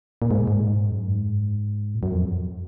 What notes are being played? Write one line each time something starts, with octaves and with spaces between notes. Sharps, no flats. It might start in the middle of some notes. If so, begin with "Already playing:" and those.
A#2
G#2
A#2
G#2
F#2
G#2
A#2
F#2
F2